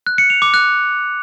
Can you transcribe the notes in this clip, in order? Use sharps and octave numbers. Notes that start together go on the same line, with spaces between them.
F#6
C#7
F7
D6
F#6